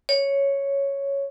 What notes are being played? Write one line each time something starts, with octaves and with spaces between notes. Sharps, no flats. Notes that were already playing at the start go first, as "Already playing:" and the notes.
C#5